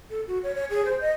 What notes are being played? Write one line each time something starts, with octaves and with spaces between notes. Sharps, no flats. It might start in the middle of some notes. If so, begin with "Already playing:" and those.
A4
F#4
C#5
C#5
G#4
C5
D#5